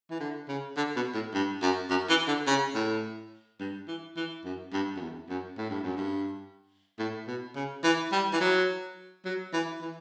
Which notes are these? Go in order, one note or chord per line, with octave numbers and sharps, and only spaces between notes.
E3
D3
C#3
D3
B2
A2
G2
F#2
F#2
E3
D3
C#3
A2
G2
E3
E3
F#2
G2
F#2
E2
F#2
A2
G2
F#2
G2
A2
B2
C#3
E3
G3
E3
F#3
F#3
E3
E3